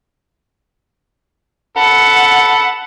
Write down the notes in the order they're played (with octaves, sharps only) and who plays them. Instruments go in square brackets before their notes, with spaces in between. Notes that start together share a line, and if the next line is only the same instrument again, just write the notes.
[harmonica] A4 B5 [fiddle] F#5